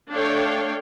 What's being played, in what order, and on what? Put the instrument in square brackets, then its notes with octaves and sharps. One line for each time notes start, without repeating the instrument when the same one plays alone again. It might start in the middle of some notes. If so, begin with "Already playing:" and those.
[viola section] A3 D4 A4 C#5 F5 G5